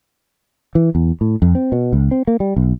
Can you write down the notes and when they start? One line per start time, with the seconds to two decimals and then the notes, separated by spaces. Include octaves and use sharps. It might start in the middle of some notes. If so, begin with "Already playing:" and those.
0.75 E3
0.95 E2
1.21 A2
1.42 F2
1.55 C4
1.72 B2
1.93 C#2
2.11 C4
2.27 A#3
2.40 G3
2.56 B1